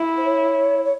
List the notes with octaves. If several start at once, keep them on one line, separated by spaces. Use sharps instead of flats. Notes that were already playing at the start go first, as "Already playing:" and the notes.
Already playing: E4
C5
C#5
C#5